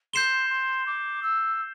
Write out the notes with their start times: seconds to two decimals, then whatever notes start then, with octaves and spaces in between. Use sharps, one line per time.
0.13 C6 G6 C7 E7 G7
0.50 C6
0.87 D6
1.23 E6